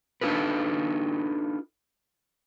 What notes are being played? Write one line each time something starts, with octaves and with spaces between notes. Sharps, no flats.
D4 D#4 F4 A4 B4